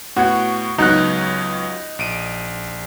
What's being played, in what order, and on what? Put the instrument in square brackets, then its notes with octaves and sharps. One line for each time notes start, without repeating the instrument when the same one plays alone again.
[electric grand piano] A2 B3 G#6 [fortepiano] F#4
[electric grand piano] C#2 F#3 B3 [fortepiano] D#4 F#6
[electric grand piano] A#1 D7 D#7